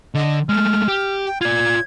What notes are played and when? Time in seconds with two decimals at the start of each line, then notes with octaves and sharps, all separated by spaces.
0.15 D3 D#5
0.49 G#3 A3 F6
0.88 G4
1.26 G5
1.41 F4 D5 G#6